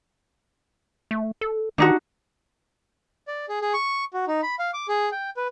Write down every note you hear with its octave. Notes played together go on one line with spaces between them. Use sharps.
A3
A4
D#3 D4 D#4 F#4
D5
G#4
G#4
C#6
F#4
D#4
B5
F5
D6
G#4
G5
B4